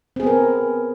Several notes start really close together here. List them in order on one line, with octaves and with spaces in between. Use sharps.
C4 G#4 B3 A#4